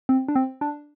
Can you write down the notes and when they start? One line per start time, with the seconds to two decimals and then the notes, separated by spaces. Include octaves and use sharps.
0.09 C4
0.28 D4
0.36 C4
0.61 D4